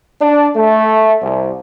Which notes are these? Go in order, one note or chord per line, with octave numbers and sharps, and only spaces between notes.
D4
A3
C2